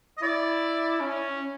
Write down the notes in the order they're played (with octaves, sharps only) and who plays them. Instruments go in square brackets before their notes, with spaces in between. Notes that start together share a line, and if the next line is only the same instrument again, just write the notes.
[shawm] D#5
[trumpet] E4 [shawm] D5
[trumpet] C#4